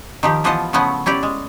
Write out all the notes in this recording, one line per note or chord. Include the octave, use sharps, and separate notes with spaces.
D#3 F3 G4
E3 F3 B3 F4 D#5 A5
C#3 F3 A3 B3 C#4 E4
C#4 E4 G4 D5
G#3